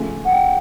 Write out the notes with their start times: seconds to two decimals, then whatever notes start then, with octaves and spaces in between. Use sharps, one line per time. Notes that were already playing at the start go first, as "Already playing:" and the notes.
Already playing: C#3 F3 A3 C#4 F4 G#5
0.25 F#5
0.32 G5